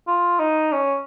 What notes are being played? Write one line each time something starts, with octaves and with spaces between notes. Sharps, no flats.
F4
D#4
C#4